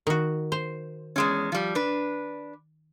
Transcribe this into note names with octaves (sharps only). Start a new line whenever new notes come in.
D#3 F#4
C5
E2 G#3 C#4
F3 G3
D4 B4